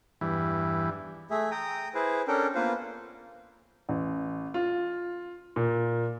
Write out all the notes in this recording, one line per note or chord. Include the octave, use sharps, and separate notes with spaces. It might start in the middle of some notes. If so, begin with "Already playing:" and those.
E2 G2 E3
A3 G#4 E5
G5 A#5 D#6
E4 G#4 B4 C5
C#4 D4 A4 A#4 G5
A#3 B3 F4 B4 C5
A1
F4
A#2